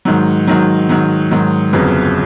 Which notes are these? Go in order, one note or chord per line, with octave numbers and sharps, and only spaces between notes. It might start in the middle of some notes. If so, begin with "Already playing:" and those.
G#2 D#3 F#3
G#2 D#3 F#3
G#2 D#3 F#3
G#2 D#3 F#3
G1 F2 C#3 F#3 B3